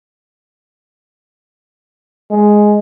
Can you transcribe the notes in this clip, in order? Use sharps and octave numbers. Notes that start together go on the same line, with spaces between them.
G#3